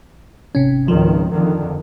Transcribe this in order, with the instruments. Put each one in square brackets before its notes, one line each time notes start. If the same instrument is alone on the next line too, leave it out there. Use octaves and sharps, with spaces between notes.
[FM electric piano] G#1 C3 C#4
[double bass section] G#1 C#2 D#3 [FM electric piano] F3
[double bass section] F2 D3 D#3